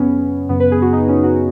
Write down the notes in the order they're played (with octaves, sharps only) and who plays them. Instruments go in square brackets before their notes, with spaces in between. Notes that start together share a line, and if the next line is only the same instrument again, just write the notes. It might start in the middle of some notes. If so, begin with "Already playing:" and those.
Already playing: [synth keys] F#2 C#3 B3 C#4
F#2 C#3 B3
B4
G#4
F#4
D#4
C#4
F#4